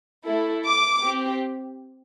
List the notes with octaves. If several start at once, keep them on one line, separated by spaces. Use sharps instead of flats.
A3 E4 A4
D6
C4 G4